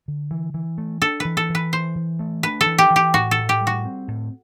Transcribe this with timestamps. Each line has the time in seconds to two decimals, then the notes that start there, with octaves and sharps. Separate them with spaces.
0.08 D3
0.31 E3
0.54 E3
0.78 A3
1.02 D4 A4
1.20 E3 B4
1.37 A4
1.50 E3
1.55 B4
1.73 E3 C5
1.95 E3
2.19 A3
2.43 D4 B4
2.61 A4
2.66 E3
2.78 G4
2.91 E3
2.96 G4
3.14 A2 F#4
3.31 A4
3.38 A2
3.49 G4
3.61 G3
3.67 F#4
3.85 C4
4.08 A2